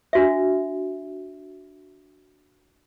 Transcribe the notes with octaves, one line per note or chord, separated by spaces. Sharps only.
D4 F#4 E5